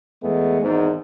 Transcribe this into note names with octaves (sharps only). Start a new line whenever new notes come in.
E2 G#3 A3 B3
G#1 E2 G#2